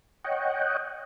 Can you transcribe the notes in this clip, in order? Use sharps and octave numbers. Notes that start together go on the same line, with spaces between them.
C#5 D#5 F#5 G5